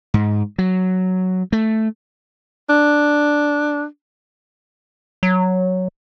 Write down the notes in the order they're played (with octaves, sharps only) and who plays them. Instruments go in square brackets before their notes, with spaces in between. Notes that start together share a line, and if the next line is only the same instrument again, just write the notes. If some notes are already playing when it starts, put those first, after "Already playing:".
[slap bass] G#2
F#3
A3
[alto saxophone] D4
[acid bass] F#3